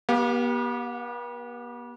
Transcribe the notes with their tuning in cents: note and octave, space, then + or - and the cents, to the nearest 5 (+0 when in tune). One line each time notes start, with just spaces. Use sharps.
B3 -45 G4 +0 F5 +25